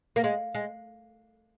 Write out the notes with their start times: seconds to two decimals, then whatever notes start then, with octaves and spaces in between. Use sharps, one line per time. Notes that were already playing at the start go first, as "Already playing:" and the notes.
0.16 A#3
0.24 G#3
0.55 G#3